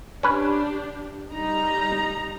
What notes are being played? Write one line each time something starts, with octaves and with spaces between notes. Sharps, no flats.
C#4 D4 G4 B4
G3 D#4 A#5